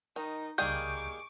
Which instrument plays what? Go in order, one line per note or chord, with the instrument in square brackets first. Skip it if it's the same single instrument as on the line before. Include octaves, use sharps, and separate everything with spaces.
[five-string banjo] D#3 [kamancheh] D#4
[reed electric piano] C#2 G6 [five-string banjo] D#3 G3 A#3 [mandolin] G#4 [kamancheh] C#6 D6